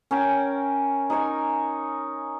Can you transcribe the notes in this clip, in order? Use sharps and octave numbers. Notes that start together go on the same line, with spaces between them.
C#4 A#4 G5
D#4 A#4 C#5 G#5